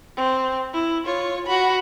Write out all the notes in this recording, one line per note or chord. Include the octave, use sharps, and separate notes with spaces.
C4
E4
F4 C#5
F#4 B5